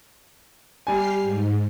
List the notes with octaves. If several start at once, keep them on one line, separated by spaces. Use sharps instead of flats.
G3 G4 G#5 F6 C7
G#2